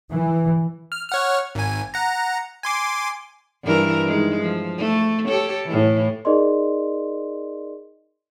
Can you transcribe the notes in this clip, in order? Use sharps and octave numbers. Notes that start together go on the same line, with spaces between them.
E3
F6
C#5 F#5 F6
G#1 G#5
F#5 A#5
G#5 C6 D6
G2 E3 A#4
D#3 G#3
F3
A3
G4 A4 C#5
A2 E3
D#4 G#4 A#4 D5 D#5 C6